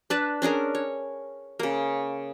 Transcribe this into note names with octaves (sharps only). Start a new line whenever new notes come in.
D4 B4 A5
C#4 D4 G#4 A#4
C#5
C#3 A#3